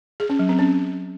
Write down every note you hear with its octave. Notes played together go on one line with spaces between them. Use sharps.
G#4
C#4
F#3
C4
C#4